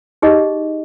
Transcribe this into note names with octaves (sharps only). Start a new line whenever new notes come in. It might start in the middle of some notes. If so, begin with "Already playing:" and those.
D#4 G4 G#4 D#5